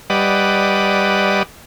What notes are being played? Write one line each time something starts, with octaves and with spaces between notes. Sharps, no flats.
G3 B4 D5 D#5 F#5